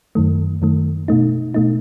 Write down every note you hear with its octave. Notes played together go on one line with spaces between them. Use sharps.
F#2 D#3 A3
F#2 D#3 A3
B2 A3 D#4
B2 A3 D#4